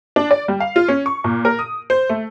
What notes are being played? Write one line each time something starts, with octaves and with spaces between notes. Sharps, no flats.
D4
D5
G3
F5
F4
C#4
C#6
A#2
A#4
D#6
C5
A3